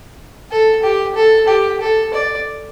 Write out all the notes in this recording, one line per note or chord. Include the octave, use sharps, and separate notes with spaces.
A4
G4
A4
G4
A4
D5